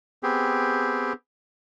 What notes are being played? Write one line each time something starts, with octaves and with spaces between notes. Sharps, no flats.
B3 C4 G4 G#4